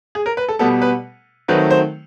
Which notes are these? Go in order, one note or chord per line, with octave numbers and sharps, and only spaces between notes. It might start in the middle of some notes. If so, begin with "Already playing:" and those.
G#4
A#4
B4
A4
B2 G3 B3 A4
B4
D#3 F#3 A3 C4 B4
C5